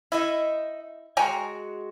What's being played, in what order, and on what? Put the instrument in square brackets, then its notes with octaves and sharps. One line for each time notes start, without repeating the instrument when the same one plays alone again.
[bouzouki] D#4 D#5 E5 [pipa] E4
[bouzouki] G#3 F#4 [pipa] G5 G#5 A#5